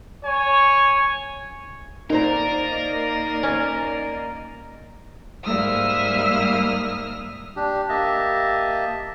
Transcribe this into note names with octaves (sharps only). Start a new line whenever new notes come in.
C#5 G#5
A#2 A#3 D#4 A#4 C5 D5 D#5 A#5
C#4
G#2 G3 A#3 E5 D#6 F6
D4 G4
A#3 G4 D#5 E5 A5